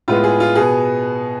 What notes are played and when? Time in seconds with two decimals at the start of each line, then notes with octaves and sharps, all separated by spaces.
0.08 A2 G#3 B3 F4
0.24 G#4
0.40 F4
0.55 B2 G#4
0.60 B3